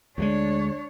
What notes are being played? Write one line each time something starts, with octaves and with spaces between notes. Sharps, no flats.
D2 F#3 G#3 D4 C#5